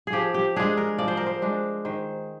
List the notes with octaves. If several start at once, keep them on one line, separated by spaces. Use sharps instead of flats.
G#4
F3 G4
G4
G#3 D4 G#4
A#4
F3 D5
C5
A#4
C5
G#3 D4
D#3 C5